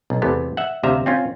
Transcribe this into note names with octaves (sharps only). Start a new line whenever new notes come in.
B1
E2 C3 A3 B3
E5 F#5
D2 C3 E5 F5 A#5
C4 C#4 F4